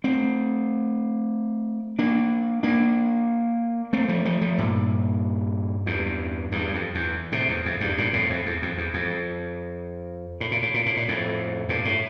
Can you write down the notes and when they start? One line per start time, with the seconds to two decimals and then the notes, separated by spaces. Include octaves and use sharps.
0.04 A3 C4
1.99 A#3 D4
2.63 A#3 D4
3.93 A3 C4
4.08 F3 A3
4.25 F3 A3
4.41 F3 A3
4.58 G2 A#2
5.86 E2 G2
6.52 E2 G2
6.73 F2
6.95 E2
7.32 A2 C3
7.48 E2
7.65 F2
7.80 E2 G2
7.98 G2 A#2
8.13 F2 A2
8.30 F2
8.46 E2
8.62 F2
8.78 E2
8.94 F2
10.40 A2
10.51 A#2
10.62 A2
10.74 A#2
10.86 A2
10.97 A#2
11.08 F2 A2
11.68 G2 A#2
11.85 A2